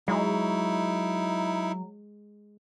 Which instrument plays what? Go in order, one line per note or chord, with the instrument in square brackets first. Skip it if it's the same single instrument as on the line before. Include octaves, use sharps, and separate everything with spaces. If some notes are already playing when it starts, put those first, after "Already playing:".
[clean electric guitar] F#3 [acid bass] G#3 [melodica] D#4 E4